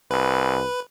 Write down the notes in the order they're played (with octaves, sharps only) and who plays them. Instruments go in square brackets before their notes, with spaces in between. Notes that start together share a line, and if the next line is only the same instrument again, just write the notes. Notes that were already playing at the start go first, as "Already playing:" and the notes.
[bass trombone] C2 [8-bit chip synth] B4